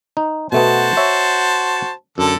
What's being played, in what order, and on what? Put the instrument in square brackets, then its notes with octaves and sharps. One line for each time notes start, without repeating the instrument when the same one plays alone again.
[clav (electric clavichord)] D#4
[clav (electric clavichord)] B2 A3 B3 [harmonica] F#4 C5 A5
[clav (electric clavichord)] C#5 E5
[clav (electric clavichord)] F#2 [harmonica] D3 A4